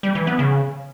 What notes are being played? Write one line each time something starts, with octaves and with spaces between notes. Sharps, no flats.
G3
E3
B3
C#3